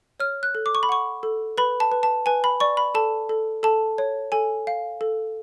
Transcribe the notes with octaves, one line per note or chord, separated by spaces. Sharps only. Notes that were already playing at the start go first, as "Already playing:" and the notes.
C#5 F6
F#6
A4
D6
C#6
B5
F#5 C#6
A4
B4 B5
A5
B4
A5
B4 G#5
B5
D5 C#6
B5
A4 A5
A4
A4 A5
C#5
A4 G#5
F5
A4